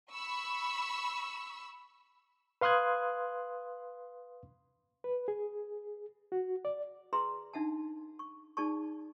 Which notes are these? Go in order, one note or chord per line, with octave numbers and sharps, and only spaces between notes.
B5 C#6 E6
B4 F5 C6 D#6 F#6 G#6
B4
G#4
F#4
D5
G#4 B4 E5 A#5 C6
D4 D#4 E5 F#5 A5
C#6
D#4 G#4 D5 A5 C#6